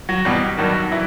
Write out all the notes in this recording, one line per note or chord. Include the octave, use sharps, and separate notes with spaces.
F#3 F#4
E2 B2 G3 G4
G2 D#3 F#3 G3 F#4
E3 F#3 E4